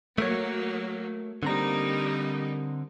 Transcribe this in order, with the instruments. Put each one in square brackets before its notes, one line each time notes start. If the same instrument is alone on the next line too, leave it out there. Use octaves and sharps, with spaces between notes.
[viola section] F#3 A#3 [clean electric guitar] A3 A#4 C#5
[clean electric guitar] D3 C4 A#5 [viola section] G3 A#3 D#4